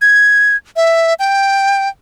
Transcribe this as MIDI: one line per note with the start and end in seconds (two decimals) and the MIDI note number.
0.02 0.56 92
0.76 1.14 76
1.19 1.89 79